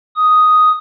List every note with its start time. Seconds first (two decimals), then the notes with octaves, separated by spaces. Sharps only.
0.16 D#6